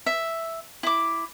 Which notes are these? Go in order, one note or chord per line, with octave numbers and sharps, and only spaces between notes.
E5
E4 D6